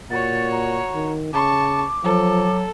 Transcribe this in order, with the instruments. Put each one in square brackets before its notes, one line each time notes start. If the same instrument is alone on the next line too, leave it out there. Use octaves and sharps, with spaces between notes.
[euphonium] A#2 [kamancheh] F#4 C#5 [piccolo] A6
[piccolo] A#5
[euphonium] D#3
[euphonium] C#3 [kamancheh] A5 C#6 [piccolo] D6
[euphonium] F3 [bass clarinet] F#3 [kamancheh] A4